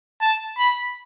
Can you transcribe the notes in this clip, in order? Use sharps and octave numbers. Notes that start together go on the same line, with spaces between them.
A5
B5